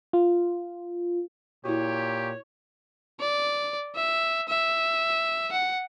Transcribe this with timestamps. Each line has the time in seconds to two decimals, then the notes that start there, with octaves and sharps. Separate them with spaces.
0.13 F4
1.65 A#2 E4 F#4 G4 C#5
3.21 D5
3.95 E5
4.49 E5
5.52 F#5